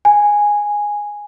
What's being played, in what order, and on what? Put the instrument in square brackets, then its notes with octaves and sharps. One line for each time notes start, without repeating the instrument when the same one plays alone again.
[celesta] G#5